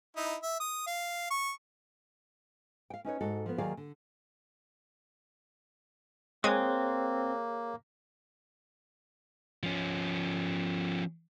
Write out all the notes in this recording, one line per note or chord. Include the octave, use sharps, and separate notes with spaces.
D#4 E4
E5
D#6
F5
C#6
F5 G5
C#4 D#4 B4 C#5
G#2 D#4 F#4 A4
F3 B3
D#2 D#3 F#3 G#4 D5 F5
D3
G#3 A#3 C4 G#4 C#5 D#6 F#6 G#6
F3 C#4